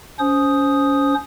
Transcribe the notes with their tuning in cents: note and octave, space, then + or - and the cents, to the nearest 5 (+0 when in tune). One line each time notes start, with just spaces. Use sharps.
C#4 +25 C5 +0 D#6 +0